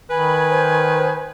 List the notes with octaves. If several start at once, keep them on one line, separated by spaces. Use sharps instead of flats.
D#3 B4 G#5 B5
C5